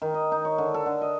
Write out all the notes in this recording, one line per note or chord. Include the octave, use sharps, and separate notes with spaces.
D#3
D#5
D#4
C#5
D3
A4
D3
D#5